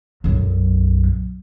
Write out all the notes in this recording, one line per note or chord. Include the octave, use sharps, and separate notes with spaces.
B1 F#2